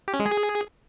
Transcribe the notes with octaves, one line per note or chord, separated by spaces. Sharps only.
G4
C#4
G#3
G#4